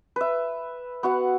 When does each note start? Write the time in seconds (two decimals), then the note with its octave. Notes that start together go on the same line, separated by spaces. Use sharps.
0.16 B4 E5
1.03 B3 F#4 F#5